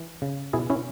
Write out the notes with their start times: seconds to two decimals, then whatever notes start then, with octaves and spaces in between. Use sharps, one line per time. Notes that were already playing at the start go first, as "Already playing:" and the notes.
Already playing: E3
0.22 C#3
0.53 B2 E4 G#4
0.70 C#4 E4